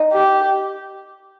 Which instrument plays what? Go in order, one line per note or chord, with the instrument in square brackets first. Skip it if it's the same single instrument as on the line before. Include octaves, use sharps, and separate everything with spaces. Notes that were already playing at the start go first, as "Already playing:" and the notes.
Already playing: [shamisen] D#4
[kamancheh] G4